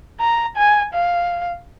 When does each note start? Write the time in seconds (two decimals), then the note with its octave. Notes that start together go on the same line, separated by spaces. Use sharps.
0.20 A#5
0.57 G#5
0.93 F5